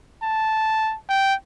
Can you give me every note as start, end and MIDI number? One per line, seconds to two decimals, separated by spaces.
0.23 0.96 81
1.09 1.35 79